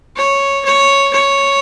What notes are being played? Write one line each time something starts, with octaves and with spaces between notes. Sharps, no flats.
C#5
C#5
C#5